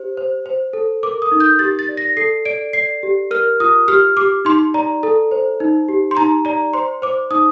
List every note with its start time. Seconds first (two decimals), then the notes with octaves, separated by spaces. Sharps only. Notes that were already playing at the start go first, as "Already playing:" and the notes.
Already playing: G4 C5
0.17 C5
0.46 C5
0.73 A4
1.03 A#4 D6
1.22 D#6
1.32 D#4
1.40 G6
1.59 G4 A6
1.79 A6
1.89 D5
1.97 A#6
2.17 A4 C7
2.45 D5 D7
2.73 D5 C7
3.03 G4
3.31 A#4 F6
3.60 F4 D#6
3.88 G4 F6
4.17 G4 D6
4.45 D#4 C6
4.74 D5 A#5
5.03 A4
5.31 C5
5.60 D#4
5.89 G4
6.11 C6
6.17 D#4 A#5
6.45 D5 A#5
6.73 C5 C6
7.02 C5 D6
7.31 D#4 D#6